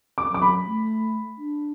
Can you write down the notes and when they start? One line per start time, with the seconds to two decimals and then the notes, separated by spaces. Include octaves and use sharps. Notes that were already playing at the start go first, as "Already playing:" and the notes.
0.18 D6
0.29 F#3
0.34 D6
0.42 B5
0.66 A3
1.38 D4